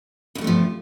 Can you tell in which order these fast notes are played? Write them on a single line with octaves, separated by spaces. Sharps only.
E2 G2 A3 C3 F3